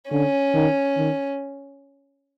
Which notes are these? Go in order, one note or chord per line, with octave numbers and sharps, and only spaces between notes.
D3 C#4
D#3
D#3